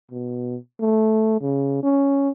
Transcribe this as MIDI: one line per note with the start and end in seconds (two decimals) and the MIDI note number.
0.11 0.57 47
0.81 1.37 57
1.41 1.82 49
1.83 2.29 61